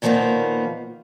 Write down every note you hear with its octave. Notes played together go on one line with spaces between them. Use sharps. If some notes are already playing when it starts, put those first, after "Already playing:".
A#2 D#3 F3 G3 A#3 B3